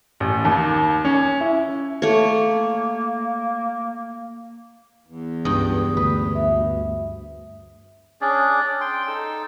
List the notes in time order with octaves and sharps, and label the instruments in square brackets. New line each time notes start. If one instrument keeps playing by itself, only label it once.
[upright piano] A1
D#2
C#4
E4
[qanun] A3 C#5 [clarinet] A#3
[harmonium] E2
[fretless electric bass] C#2 [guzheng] G2 G5 [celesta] D#6
[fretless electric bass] D2 [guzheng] B4 [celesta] D#6
[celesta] E5
[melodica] C#4 D4 G#4 D5
G5 C6
D#4 A4 E6